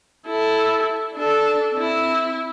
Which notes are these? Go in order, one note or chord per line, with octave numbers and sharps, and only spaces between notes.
E4 A4
D4 A4
C4 E4